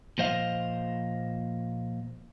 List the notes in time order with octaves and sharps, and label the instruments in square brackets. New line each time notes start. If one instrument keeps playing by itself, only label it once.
[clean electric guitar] A#2 F3 C5 D#5 F5